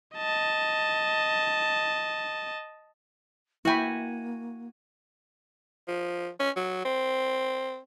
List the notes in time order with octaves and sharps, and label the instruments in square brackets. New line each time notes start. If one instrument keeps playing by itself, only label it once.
[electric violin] D#5 A5
[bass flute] A#3 [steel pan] E4 G5 B5 [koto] F#4 G#5
[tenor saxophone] F3
C#4
F#3
C4